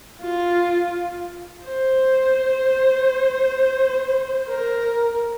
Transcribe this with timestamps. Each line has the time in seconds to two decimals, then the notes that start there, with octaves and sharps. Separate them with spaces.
0.21 F4
1.64 C5
4.49 A#4